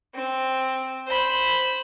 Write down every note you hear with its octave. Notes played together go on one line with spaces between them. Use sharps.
C4
C5 B5